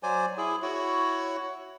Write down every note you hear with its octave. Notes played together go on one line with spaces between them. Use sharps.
F#3 C5 D5 G#5
E4 G#4
E4 F#4 C#5